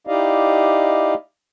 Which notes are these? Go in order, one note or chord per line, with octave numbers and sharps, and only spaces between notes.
D#4 E4 G4 D5 D#5 F5